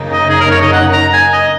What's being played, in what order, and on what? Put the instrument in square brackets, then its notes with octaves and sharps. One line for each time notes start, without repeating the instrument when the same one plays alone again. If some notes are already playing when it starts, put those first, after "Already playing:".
Already playing: [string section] F#2 C#3 A#3 D#4
[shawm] D#5
G#4
A#4
C#5
D#5
F#5
A#5
G#5
D#5